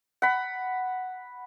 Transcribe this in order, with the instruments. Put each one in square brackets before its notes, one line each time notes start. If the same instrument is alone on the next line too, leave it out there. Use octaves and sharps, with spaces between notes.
[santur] F#5 B5